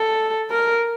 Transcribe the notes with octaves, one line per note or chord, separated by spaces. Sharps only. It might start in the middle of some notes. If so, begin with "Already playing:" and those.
Already playing: A4
A#4